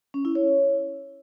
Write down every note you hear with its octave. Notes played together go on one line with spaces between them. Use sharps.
C#4
E4
C#5